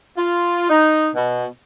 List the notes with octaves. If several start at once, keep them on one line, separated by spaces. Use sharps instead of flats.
F4
D#4
B2